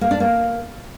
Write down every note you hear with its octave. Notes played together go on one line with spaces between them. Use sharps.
A#3
D4
A#3